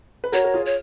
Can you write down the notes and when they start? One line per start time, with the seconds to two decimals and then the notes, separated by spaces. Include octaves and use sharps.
0.24 B4
0.32 F#4 A#4 C#5
0.44 A#4
0.54 F4 G#4
0.66 C#5